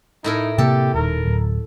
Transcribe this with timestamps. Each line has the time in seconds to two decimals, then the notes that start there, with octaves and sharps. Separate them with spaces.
0.24 A2 D#4 E4 A#4
0.58 C3 A#3 G4 A4
0.94 D#1 D#3 A#4
1.25 D1